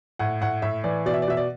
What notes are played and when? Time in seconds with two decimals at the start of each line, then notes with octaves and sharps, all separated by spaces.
0.19 A2 F#5
0.41 A2 F#5
0.62 A2 E5
0.84 E3 D5
1.06 B2 D5
1.14 E5
1.22 D5
1.28 B2 E5
1.37 D5